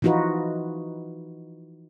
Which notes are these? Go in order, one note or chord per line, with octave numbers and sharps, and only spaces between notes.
E3 F3 D#4 F4 F#4 B4